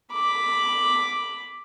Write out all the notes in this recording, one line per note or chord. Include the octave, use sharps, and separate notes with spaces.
B5 D6